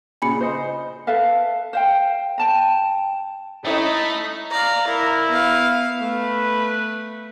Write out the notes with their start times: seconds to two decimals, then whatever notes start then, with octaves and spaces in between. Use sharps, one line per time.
0.22 A#2 C#3 G#5 B5 C#7
0.41 C5 D#5
1.07 A4 B4 E5 F5
1.73 C5 F5 G5
2.38 G5 A5 A#5
3.65 A3 C#4 D#4 E4 A4 D#5 B5
4.51 D5 F5 A#5
4.87 E4 A#4
5.29 B3 F5
6.00 A3 B4